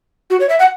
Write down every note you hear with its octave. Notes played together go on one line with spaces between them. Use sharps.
F#4
C#5
E5
F#5